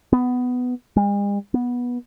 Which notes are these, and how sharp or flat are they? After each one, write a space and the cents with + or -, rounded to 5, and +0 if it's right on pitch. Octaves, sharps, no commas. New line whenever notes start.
B3 +10
G#3 -45
B3 -15